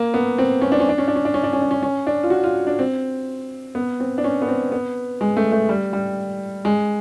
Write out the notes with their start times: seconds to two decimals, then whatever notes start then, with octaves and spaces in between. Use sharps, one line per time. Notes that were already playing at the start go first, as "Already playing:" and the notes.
Already playing: A#3
0.14 B3
0.38 C4
0.61 C#4
0.72 D4
0.80 C#4
0.89 D4
0.98 C#4
1.08 D4
1.16 C#4
1.25 D4
1.34 C#4
1.43 D4
1.53 C#4
1.62 D4
1.71 C#4
1.82 C#4
2.07 D4
2.23 F4
2.30 F#4
2.44 F4
2.67 D4
2.79 C4
3.75 B3
4.00 C4
4.18 D4
4.24 C#4
4.42 B3
4.48 C4
4.72 B3
5.21 G#3
5.37 A3
5.52 A3
5.69 G3
5.93 G3
6.65 G#3